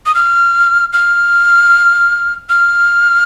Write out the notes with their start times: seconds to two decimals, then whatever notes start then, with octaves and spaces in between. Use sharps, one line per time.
0.06 D#6
0.15 F6
0.93 F6
2.49 F6